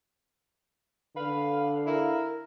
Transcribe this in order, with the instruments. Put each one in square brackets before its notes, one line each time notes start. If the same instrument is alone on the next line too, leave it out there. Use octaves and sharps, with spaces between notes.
[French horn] D3 [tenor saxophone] B4 [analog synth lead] F5
[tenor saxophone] E4 [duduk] A#4